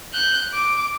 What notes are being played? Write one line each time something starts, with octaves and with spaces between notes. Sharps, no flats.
F#6 G6
D6